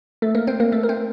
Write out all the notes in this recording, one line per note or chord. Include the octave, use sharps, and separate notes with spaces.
A3 A4
A#3 A#4
C4 C5
A#3 A#4
A3 A4
A#4
C4 C5